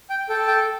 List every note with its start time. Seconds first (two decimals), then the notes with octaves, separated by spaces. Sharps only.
0.10 G5
0.29 A4 G5
0.47 G5